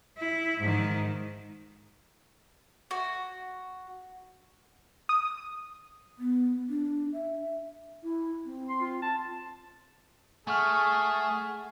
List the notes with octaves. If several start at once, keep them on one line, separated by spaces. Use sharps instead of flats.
E4
G#2 D#3
F#4
D#6
B3
D4
E5
E4
C4
C6
F4
A5
A3 G#4 F#5 G#5 C#6 F6